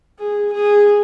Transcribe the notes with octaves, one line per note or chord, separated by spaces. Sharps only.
G#4
G#4